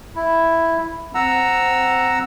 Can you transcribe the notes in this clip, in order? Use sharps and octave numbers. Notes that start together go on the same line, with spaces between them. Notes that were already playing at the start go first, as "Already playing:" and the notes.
E4
C4 F#5 A#5 E6